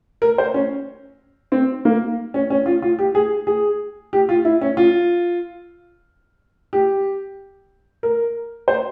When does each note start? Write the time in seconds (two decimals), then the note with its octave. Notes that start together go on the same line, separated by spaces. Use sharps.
0.22 A#4
0.38 C5
0.54 C#4
1.52 C4
1.85 A#3
2.34 C#4
2.50 C#4
2.66 F4
2.82 F4
2.99 G4
3.15 G#4
3.47 G#4
4.13 G4
4.29 F4
4.45 E4
4.61 C#4
4.77 F4
6.73 G4
8.03 A#4
8.68 C5